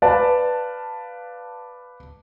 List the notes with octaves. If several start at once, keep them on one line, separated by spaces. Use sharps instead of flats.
B4 D5 F5 A5